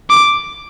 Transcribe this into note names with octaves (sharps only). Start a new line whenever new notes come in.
D6